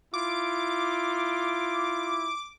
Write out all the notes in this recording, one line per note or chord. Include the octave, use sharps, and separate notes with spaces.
E4 F4 D6